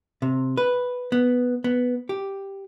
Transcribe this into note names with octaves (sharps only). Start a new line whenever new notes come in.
C3
B4
B3
B3
G4